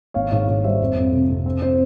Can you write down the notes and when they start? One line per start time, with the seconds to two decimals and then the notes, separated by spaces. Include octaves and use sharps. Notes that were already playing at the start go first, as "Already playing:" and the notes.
0.14 G#1 C#5 F5
0.31 G#2 C#5 F5
0.48 G#2 C#5
0.64 G3 C5 E5
0.80 F2
0.97 F2
1.13 C3
1.29 F2
1.46 C4
1.61 C4 C5